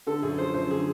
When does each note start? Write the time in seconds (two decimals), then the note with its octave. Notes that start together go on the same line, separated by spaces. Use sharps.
0.07 D3 A4
0.22 F#2 G#4
0.38 F3 C5
0.54 F#2 C5
0.70 D3 G#4